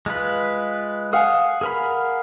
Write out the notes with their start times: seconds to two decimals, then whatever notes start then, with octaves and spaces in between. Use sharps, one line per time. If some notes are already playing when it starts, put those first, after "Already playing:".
0.06 G#3 F4 B4
1.13 F5 F#5 G#5 D#6
1.61 G#4 A#4 B5